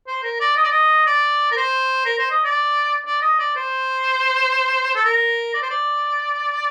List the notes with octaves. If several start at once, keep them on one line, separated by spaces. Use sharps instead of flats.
C5
A#4
D5
D#5
D5
D#5
D5
A#4
C5
A#4
C5
D#5
D5
D5
D#5
D5
C5
A4
A#4
D5
C5
D5